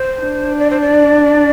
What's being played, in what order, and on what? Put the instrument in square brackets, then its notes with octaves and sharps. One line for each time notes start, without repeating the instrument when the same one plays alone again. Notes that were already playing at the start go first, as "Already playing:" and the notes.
Already playing: [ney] C5
[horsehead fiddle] D4
[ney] D5
C5
D5